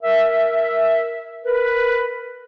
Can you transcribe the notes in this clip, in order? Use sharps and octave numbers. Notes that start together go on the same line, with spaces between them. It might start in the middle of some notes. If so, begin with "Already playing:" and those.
A#4 E5
A#4 B4